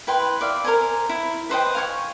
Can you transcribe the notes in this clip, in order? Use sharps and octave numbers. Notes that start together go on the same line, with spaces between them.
E4 B4 G5 C6
D5 E5 F5
A#4 C5 G#5
E4
B4 C5 D#5 G5
F5 G#5 C#6